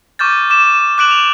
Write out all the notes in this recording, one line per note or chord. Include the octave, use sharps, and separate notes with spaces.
C#6 D6 F6 G6 A6
D6 E7
D6 F#6 D7 F#7
F7